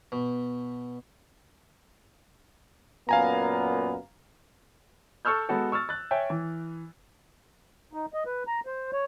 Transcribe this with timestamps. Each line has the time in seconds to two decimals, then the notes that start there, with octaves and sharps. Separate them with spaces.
0.12 B2
3.09 F#2 A#2 B3 F5 G#5 A#5
5.25 A4 C#6 E6 F6 G6
5.49 G#3 B3 F#4 A4
5.72 C#6 E6 F6 A6
5.89 F#6 A6
6.11 C#5 E5 G5 G#5
6.30 E3
7.93 D#4
8.14 D#5
8.26 B4
8.47 A#5
8.66 C5
8.93 C#5